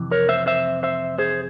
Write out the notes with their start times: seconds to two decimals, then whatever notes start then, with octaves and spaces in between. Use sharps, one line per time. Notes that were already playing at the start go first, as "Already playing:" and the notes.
Already playing: F2 C3 E3
0.11 A#4 C#5
0.29 C5 E5
0.47 C5 E5
0.83 C5 E5
1.18 G#4 C5